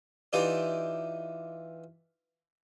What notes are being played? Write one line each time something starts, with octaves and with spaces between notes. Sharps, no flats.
E3 D#4 F4 G4 D5